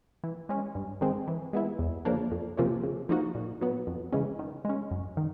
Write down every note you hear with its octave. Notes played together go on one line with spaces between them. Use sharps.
E3
G#3 C#4
G2
D#3 G#3 C4
E3
G#3 B3 E4
E2
C#3 F3 A#3 D4
F2
C3 F3 A#3 C#4
C#3
F3 A#3 D#4 F#4
A#2
F#3 B3
F2
C#3 E3 G#3 C#4
D#3
G#3 C#4
F#2
D#3